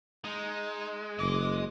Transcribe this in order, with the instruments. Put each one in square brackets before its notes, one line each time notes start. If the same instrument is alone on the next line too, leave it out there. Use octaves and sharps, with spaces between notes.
[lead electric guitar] G#3 [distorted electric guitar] D#4 D#5
[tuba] F#1 [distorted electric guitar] D#5 [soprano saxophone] D6